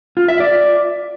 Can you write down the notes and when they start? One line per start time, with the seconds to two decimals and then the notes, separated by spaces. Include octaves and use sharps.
0.17 F4
0.28 E5
0.40 D5